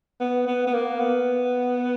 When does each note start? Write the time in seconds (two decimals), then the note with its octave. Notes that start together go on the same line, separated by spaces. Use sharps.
0.20 B3
0.47 B3
0.67 B3
0.74 A#3
1.00 B3